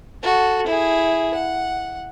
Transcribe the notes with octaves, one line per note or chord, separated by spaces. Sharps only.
F#4 A4
E4 G#4
F#5